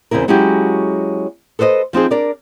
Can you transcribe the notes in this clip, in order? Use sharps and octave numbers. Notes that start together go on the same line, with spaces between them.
E2 C#3 C4 E4 A#4
F#3 G#3 C#4 E4 F#4 G4
A4 B4 C5 D5 D#5
F3 C4 D#4 G#4
D4 A#4 D5